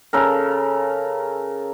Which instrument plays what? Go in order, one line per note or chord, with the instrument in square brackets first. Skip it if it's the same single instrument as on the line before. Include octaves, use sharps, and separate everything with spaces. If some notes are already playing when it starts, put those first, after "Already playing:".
[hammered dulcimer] C#3 A4 A#4